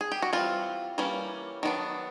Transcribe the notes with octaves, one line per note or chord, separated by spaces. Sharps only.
G#4
G4
F#4
E3 G3 C4 F4
E3 G3 A#3 C#4
D#3 F#3 B3 D4